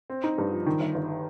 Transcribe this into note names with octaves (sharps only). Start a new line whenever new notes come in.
C4
D#4
G2
F3
D#3
G1
G1